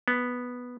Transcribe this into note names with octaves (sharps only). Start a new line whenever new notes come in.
B3